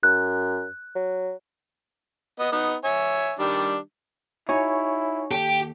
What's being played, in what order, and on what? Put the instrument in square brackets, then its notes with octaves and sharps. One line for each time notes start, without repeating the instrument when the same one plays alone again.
[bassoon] F#2 [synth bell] F#6
[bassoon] F#3
[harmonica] B3 D#5
B3 D#4
C#5 E5 G#5
D#3 G3 D4
[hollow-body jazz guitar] D#4 F#4 [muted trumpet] E4 [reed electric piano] C#5 G#5 C#6
[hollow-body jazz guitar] D#2 A4 [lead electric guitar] G4